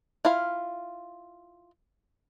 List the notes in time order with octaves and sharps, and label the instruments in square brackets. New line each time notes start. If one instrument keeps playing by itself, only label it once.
[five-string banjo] E4 F4 F5